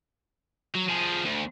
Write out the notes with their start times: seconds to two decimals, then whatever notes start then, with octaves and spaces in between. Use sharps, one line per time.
0.75 F#3
0.89 F3 G#4
1.25 D2